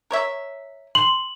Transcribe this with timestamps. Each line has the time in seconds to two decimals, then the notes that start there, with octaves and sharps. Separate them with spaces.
0.11 A#4 C#5 E5
0.95 C6 F#7